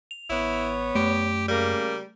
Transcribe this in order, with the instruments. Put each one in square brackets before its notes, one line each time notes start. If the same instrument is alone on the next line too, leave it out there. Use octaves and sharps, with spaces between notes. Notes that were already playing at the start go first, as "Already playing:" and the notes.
[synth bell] F7
[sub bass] A1 [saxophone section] B3 C#5 [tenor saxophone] E4
[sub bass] F#2 [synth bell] A3 [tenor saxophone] G4
[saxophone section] C#3 A#3 A#4 [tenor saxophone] G3